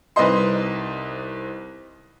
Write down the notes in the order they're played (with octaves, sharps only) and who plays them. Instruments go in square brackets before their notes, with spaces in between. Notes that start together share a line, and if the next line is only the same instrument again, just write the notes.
[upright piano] C2 D#4 B4 C5 D#5 C6